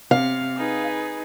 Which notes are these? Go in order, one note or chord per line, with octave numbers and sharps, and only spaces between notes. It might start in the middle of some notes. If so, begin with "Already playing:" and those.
C3 F5
D#4 G#4 B4